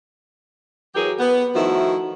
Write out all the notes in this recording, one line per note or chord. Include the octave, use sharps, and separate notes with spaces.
E3 F#3 G4 G#4 A#4
B3
D#3 F3 A3 E4 F#4